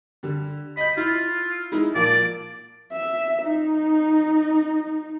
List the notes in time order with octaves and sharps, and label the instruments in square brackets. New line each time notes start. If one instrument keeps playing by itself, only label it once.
[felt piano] D3 G3
[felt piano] D#5 G6 [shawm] B5
[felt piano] E4 [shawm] F4
[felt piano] G#3 D#4 E4
[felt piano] A#2 F3 A#3 [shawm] D5
[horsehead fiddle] E5
D#4